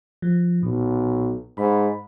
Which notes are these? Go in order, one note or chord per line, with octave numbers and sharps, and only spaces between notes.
F3
B1 A#2
G#2 B5